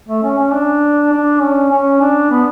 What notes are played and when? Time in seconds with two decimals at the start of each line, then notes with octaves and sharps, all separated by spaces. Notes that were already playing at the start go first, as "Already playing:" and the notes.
0.09 A3
0.23 C#4
0.38 C#4
0.53 D4
1.12 D4
1.42 C#4
1.71 C#4
2.01 D4
2.30 B3